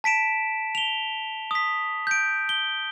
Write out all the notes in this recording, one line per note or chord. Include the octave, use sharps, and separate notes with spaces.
A5 B6 D7 E7
F7 G7
D#6 B6
G6 D7
G7